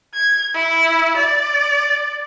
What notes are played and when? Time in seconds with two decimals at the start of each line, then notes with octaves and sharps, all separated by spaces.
0.14 G#6
0.54 E4
1.17 D5